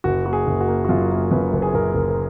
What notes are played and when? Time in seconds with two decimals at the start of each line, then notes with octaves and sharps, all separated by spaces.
0.04 F#1 F#4
0.26 A#3 F#4
0.33 G#4
0.47 F#1
0.61 F#4
0.68 A#3
0.85 F#4
0.89 F#2 F4
1.11 A#3
1.31 F#2 B4
1.53 F#1
1.62 G#4
1.74 F#1 A#4
1.95 F#1
2.10 A#4